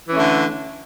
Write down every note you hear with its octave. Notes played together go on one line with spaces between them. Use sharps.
D3 E3 A3 C#4